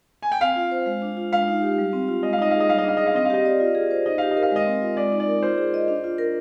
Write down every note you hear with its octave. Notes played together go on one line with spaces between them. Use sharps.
G#5
G5
C4 F5
F4
C5
G#3
D4
F4
G#3 F5
D#4
G4
G3
C4
F4
G#3 D#5
F5
D#4 D#5
G#4 F5
D#5
G3 F5
D#5
D4 F5
G#4 D#5
F5
C4 D#5
F5
G4 D#5
D5
F4
G#4
C5
D#4 D#5
G4 F5
D#5
A#4
F5
G#3 D#5
C4
F4
G#3 D5
D#4
D5
A#4
F4 C5
G#4
D#5
D4
F4
A#4